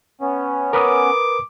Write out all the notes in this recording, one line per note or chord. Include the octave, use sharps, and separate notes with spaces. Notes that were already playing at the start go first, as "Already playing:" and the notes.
B3 C#4
A#4 B4 D6 D#6